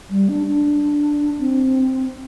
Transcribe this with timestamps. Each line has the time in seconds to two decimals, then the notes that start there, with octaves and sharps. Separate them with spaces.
0.10 G3
0.29 D4
0.47 D4
1.39 C4